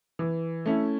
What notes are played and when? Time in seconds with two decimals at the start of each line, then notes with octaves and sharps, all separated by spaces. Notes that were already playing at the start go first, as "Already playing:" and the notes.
0.19 E3
0.66 A3 C#4 E4